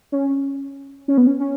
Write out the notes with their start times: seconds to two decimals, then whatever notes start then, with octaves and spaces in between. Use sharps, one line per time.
0.12 C#4
1.08 C#4
1.18 B3
1.27 C#4
1.40 C#4